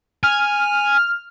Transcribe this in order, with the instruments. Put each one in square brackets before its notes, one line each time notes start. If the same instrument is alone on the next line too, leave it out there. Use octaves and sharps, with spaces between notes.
[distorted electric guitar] G#5 [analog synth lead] F6